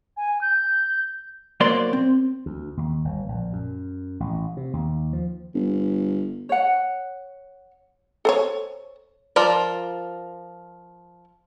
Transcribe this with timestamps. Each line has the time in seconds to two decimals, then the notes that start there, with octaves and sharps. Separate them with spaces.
0.17 G#5
0.41 G6
1.60 B1 F#3 A#3 C5 D5 C6
1.93 C4
2.46 D2
2.77 D#2
3.05 G1
3.28 A#1
3.53 F#2
4.20 A1
4.57 C3
4.73 D#2
5.13 F3
5.54 G1
6.49 C#5 F#5
8.25 A4 C5 C#5
9.36 F3 F4 A#4 D5